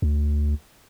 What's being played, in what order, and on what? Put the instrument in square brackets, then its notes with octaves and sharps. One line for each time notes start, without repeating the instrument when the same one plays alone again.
[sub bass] D2